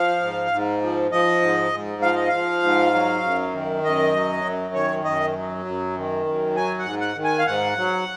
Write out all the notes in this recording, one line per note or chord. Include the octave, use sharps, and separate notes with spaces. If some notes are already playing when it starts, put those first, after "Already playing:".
Already playing: F3 F5
G#2
G#2
F3
F3 D#5
G#2
G#2
F3 F5
D#5
F3 F5
G#2
F#3
F#2
D#3
F#2 D#5
F#3
F#2
D#3 C#5
F#2 D#5
F#3
F#2
D#3
F#2
F#3 G#5
F#5
G#2
F#5
D#3
G#5
F5
G#2 F#5
F#3